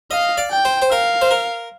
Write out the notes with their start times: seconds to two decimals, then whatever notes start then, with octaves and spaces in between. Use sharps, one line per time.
0.11 D#5 F5
0.37 D5
0.51 G5
0.65 C5
0.82 C5
0.91 A#4 F5
1.22 C5
1.31 A#4